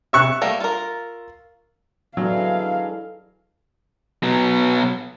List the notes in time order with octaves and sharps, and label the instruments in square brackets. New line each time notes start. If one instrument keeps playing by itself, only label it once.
[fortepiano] E5 C#6 F#6
[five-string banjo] G3 A3 A#3
F4 A#4
[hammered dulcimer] D3 E3 G#3 [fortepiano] F#3 [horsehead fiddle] F5
[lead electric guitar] B2 F#3